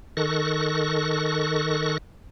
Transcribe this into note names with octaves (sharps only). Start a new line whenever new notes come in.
D#3 A4 C#6 F#6 A#6